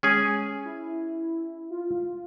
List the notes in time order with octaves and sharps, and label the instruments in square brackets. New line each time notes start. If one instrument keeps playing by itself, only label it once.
[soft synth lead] G#3 [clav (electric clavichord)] C#4 G#4 G#5
[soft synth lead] E4
F4